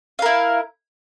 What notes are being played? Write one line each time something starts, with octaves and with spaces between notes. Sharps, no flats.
E4 A#4 F5